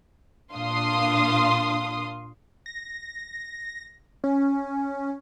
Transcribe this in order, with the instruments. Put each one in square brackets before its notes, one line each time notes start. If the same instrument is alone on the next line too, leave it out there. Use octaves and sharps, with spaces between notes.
[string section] A#2 D4 F5 C6 D#6
[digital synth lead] A#6
C#4